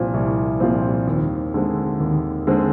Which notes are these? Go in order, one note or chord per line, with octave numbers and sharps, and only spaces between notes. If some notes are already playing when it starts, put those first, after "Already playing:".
Already playing: C2 A#2 F3 C4
C2
A#2 F3 C4
D#2
D3 G#3 C4
D#2
D3 G#3 C4